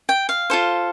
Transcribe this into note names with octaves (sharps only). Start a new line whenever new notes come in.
G5
F5
F4 A4 C5